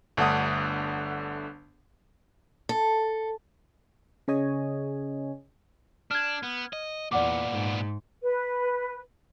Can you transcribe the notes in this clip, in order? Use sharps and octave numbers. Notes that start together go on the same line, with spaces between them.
G1 D3 A3 D4 F#5 D#6
A4
C#3 C#4 G#4 C#5 D#5 G#5
D4 F6 G#6
B3
D#5
E2 A#2 B3 D5 F#5 D6
G#2
B4